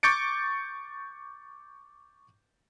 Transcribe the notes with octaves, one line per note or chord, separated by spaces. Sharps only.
C#6 D6 G6 A6 C#7 D7